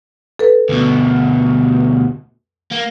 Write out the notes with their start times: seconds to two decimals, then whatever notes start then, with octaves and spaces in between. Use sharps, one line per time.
0.39 A4 B4
0.69 D2 B2
2.71 A#3